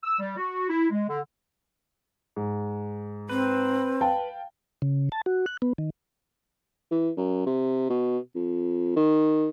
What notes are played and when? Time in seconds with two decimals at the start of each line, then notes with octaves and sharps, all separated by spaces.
0.03 E6
0.19 G3
0.37 F#4
0.69 E4
0.90 G#3
1.08 D3
2.36 G#2
3.29 C4 B4
4.01 F5 G5 A5
4.82 C#3
5.12 A5
5.26 F#4
5.46 F#6
5.62 B3
5.78 D#3
6.91 E3
7.17 F#2
7.46 C3
7.90 B2
8.35 F2
8.96 D#3